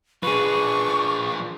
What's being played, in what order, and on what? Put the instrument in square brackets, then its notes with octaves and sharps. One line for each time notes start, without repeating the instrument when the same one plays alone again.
[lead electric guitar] F3 D4 [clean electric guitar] G#4 B4 [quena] C#6